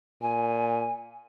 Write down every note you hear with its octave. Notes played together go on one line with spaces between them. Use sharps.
A#2 G#5